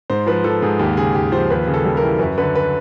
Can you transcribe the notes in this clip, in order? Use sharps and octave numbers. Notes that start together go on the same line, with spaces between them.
G#2 C5
F3 B4
F3 A4
G#2 G#4
D#2 G4
C#3 G#4
D#2 G4
F3 C5
D#2 B4
C#3
A4
G3
E3 A#4
F#2 B4
D3 B4
B4